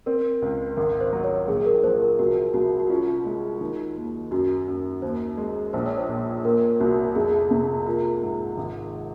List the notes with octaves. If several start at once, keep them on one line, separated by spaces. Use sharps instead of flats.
C4 A#4
C#2
G#1 A#4
C5
F#3
C#5
A#1 G#4
A#4
F3 C5
A#4
C2 F#4
C2 F#4
F#4
C#4 F4
G#3
D#3
D#2
F#2 F#4
F#2
D#2 C5
G#3
A#1 C5
C#5
C5
A#2
A#2 A#4
C2 F#4
F2 G#4
C3
A#3 F4
G#2
G#1